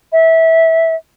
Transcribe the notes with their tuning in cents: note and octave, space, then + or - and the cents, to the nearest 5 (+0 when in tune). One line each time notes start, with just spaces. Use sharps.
E5 -20